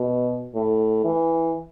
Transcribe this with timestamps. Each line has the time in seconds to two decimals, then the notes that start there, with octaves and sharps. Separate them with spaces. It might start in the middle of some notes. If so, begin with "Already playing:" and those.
Already playing: B2
0.54 A2
1.05 E3